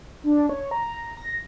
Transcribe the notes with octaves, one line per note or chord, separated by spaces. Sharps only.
D4
C#5
A#5
A#6